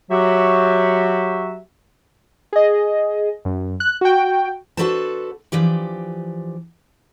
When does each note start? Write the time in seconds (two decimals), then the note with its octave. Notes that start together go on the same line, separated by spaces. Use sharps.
0.11 F#3 F#4 G4 E5
2.53 G#4 D#5
3.45 F#2
3.80 F#6
4.01 F#4 G5
4.77 D4 F#4 A4 B4 C5 A5
5.52 E3 F3 D4 G4